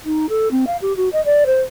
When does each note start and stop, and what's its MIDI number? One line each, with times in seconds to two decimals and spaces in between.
0.05 0.26 63
0.29 0.48 69
0.51 0.64 60
0.67 0.77 77
0.82 0.95 67
0.97 1.09 66
1.12 1.23 75
1.25 1.44 74
1.46 1.61 72